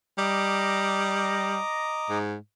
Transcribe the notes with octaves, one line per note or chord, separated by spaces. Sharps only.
G3 D#5 A#5 D6
G#2